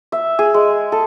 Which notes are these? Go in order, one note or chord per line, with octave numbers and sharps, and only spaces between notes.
E5
G#4
G#3
A4